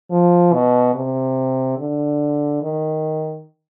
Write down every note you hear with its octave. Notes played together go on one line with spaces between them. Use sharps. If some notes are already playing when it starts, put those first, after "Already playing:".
F3
B2
C3
D3
D#3